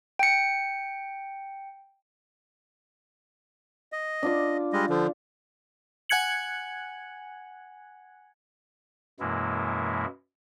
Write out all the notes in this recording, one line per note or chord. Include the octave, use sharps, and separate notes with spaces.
G5 C#7
D#5
D4 F4 D5
G3 G#3 D#5
D3 F3
F#5 G#5 F#6 G#6 C#7 F#7
F#2 B2 E3 G#3 A#3 E4